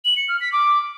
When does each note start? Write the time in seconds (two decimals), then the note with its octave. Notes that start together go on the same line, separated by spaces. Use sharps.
0.05 F#7
0.17 C#7
0.29 F6
0.41 B6
0.53 D6